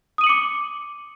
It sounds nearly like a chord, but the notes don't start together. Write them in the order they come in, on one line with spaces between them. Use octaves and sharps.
D#6 D#7 F#7 C#7 D6